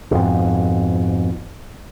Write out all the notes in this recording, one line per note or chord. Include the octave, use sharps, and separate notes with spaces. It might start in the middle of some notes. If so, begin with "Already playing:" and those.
F2 G#2 B2